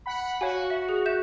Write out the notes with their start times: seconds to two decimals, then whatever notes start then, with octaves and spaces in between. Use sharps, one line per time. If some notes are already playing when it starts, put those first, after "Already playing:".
0.06 F#5 B5
0.41 F#4 C#5 F5 G#5
0.70 E5
0.89 G#4
1.06 E5 G6 E7